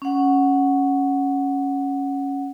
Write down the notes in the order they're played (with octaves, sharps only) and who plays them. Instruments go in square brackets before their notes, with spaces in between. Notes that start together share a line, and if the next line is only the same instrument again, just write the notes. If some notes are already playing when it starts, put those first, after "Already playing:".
[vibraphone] C#4 F#5